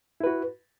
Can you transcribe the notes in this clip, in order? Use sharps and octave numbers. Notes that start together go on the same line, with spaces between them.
E4 F#4 B4